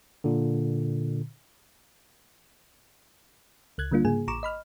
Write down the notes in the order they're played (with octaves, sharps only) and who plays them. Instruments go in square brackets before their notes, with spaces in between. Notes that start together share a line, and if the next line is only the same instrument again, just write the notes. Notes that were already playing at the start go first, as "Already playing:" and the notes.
[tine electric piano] A#2 D3
[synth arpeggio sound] C#2 F#6 G#6
D3 G3 A#3 D4 F4
G#2 C#3 A#3 G#4 G#5
A1 A#5 C#6 D6 E7
D#5 B5 F6